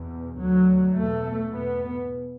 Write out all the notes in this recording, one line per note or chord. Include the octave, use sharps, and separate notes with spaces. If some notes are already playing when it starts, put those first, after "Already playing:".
Already playing: E2 B2
D2 F#3
E2 B2 A3
E2 B2 B3